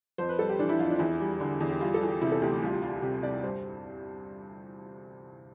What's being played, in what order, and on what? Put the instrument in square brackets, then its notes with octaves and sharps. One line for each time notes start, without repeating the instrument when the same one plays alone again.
[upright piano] F2 C5
B4
G3 A4
G4
E3 D4
E4
F2 F4
D4
E2 E4
G3
D3
E2
G4
G3 F4
A4
E3
G4
C3 E4
A4
D2 G4
C2 F4
G4
G3 F4
F4
C3 G4
C2 D5
G2 C5